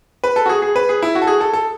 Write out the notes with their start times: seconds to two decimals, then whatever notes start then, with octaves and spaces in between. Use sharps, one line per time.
0.24 B4
0.36 A4
0.46 F#4
0.49 G#4
0.62 G#4
0.76 B4
0.89 G#4
1.02 E4
1.15 F#4
1.22 A4
1.27 G#4
1.41 A4
1.53 A4